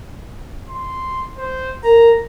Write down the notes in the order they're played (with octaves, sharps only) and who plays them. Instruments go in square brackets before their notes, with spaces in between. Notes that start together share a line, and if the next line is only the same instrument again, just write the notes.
[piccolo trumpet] C6
C5
[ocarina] A#4 [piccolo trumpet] A#5